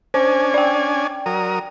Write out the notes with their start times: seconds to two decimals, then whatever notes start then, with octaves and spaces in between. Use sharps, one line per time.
0.14 C#4 D4 C5 G#5
0.54 D5 G5
1.26 F#3 A#4 D#6